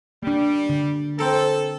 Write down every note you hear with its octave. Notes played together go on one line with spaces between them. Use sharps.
G3 A#3 D4
D3
C4 A4 A#4